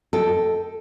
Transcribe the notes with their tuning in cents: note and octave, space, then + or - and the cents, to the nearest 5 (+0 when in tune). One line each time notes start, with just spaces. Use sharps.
A4 +0 D#5 +10 G5 +0